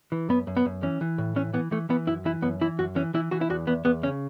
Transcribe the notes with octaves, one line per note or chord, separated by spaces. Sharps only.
E3
F#2 B3
F#2
B3
F#2
E3 C#4
E3
A2
E3 C#4
E3 B3
E3 A3
E3 B3
F#2 E4
E3 E4
F#2 B3
E3 E4
F#2 F#4
E3 C#4
E3 E4
E3 F#4
E4
E2 F#4
E2 B3
E2 B3
C#3 C#4